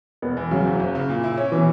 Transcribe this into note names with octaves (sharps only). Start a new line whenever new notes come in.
E1 B3
E3
C#3 F#3
F#1
F#1
C#3
A#2
E4
C#4
B2 E3